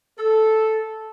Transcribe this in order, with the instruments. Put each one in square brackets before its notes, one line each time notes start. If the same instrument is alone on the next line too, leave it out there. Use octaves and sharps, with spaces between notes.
[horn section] A4